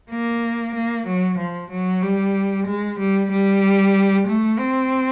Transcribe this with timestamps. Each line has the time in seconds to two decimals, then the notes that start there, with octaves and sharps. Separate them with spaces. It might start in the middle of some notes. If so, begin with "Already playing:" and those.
0.11 A#3
0.74 A#3
1.06 F#3
1.38 F3
1.70 F#3
2.02 G3
2.67 G#3
2.99 G3
3.31 G3
4.27 A3
4.59 C4